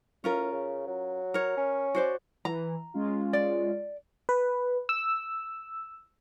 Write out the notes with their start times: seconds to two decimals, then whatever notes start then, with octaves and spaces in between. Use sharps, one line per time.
0.24 A2 C#4 F4 A#4
0.52 C#3
0.87 F#3
1.34 A#4 C#5
1.57 C#4
1.95 F#4 C5 D5
2.45 E3 A#5
2.94 G#3 C#4 F4
3.33 D5
4.29 B4
4.89 E6